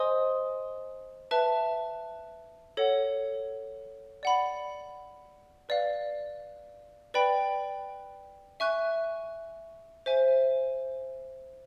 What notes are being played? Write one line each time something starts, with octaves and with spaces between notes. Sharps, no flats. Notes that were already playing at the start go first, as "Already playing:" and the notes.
Already playing: C5 D#5 G#5 C6 D#6
B4 E5 A5
A4 C#5 F#5
D5 F#5 B5
B4 D5 F5
B4 D5 G5 B5
E5 G#5 C#6 F#6
C5 E5 G#5